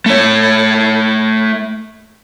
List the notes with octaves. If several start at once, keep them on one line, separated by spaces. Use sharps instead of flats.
A3 C#5